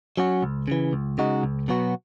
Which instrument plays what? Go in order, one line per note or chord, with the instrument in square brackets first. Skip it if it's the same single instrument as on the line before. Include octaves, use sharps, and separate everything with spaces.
[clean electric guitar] F#3 C#4 F#4
C#2
C#3 E3
C#2
C#3 G#3 D#4 F#4
C#2
B2 F#3 B3 F#4